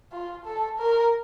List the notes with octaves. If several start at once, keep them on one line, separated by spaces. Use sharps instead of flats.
F4
A4
A#4